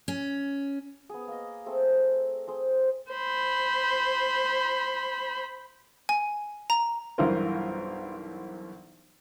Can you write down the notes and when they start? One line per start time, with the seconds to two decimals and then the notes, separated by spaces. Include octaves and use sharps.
0.08 C#4
1.09 B3 G#4
1.28 A#3 D#5
1.66 A3 C4 G#4
2.47 C4 G#4 C5
3.12 C5 B5
6.09 G#5
6.70 A#5
7.18 B1 G2 E3 F4 A#4 C5